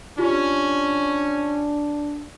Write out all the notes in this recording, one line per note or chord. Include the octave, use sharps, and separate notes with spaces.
C#4 D4 F4 G4